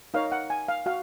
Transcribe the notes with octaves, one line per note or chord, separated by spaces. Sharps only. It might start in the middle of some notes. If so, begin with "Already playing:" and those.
D#4 A#4 C#5 F5
F#5
G#5
F5
F#4 F5